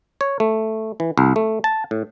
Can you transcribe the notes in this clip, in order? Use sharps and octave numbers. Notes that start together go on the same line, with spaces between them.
C#5
A3
E3
C2
A3
A5
A2